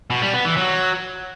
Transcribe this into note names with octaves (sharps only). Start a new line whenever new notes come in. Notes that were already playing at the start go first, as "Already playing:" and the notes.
B2
G3
B3
E3
F#3